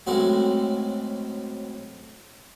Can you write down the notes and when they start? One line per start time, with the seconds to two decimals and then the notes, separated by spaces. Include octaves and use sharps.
0.07 A2 F#3 G#3 C4 C#4 F#4